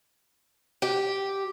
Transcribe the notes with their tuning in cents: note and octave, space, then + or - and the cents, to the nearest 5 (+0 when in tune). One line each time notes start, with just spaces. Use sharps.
G4 -5